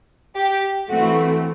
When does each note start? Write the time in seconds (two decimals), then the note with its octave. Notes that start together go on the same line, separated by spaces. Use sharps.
0.35 G4
0.90 E3 A3 C4 F#4